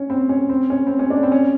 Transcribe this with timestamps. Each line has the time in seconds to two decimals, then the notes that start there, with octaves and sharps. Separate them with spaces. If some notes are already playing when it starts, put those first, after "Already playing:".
Already playing: C#4
0.10 C4
0.29 C#4
0.49 C4
0.70 C#4
0.87 C4
0.99 C#4
1.10 D4
1.23 C4
1.32 C#4